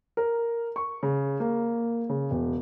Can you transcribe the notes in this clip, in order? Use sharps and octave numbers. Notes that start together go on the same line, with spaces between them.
A#4
C#6
C#3
A#3
C#3
E1